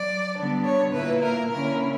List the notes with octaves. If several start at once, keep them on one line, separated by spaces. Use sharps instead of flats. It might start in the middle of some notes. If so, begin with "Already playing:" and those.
Already playing: F#3 D5
D3 G3 B3 D4
C#5
A#2 A#3 E4 B4
A#4
D3 A#3 C#4 E4 A#4